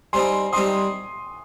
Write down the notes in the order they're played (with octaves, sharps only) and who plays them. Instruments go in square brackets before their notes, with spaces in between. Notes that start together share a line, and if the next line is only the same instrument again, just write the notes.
[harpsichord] G3 C4 D#4 [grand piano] G#5 C6
[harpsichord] G3 C4 D#4 [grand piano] C6 D#6